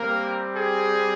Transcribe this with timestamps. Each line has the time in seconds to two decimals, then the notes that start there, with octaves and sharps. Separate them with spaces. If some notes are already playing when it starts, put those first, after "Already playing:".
Already playing: G3 A#3 C4 G4 A#4
0.56 G#4